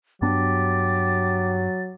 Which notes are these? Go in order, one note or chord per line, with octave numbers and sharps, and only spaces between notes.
G2 F#3 B3 D4 G4 A6